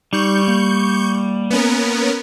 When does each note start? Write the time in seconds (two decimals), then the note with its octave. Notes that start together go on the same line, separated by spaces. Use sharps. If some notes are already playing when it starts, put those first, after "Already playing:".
0.13 G3 D#4 C#6 G6
0.48 A#3
1.50 A#3 B3 C#4 A#4